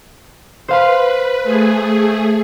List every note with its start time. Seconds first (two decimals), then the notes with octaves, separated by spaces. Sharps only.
0.68 B4 C5 F5 C6
1.43 A3 G#4